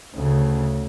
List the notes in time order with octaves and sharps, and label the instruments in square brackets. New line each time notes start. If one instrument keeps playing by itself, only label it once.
[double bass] D2 C#3